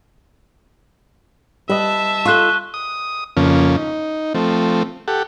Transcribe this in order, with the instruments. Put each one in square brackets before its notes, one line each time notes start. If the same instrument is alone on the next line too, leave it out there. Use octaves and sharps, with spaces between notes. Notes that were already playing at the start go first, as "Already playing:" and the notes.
[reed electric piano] G3 D#5 [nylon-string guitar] B4 [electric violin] E5 A5
[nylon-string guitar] F4 A4 [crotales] C#6 F#6 G7
[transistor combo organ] D#6
F2 C#3 F3 A#3 C#4
D#4
F3 A3 C4
G4 A4 F#5